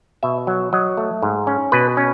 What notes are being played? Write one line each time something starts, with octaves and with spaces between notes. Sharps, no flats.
B2 E5
F#3
F#3 D#5
A3
G#2
C#4
B2 B4
C#4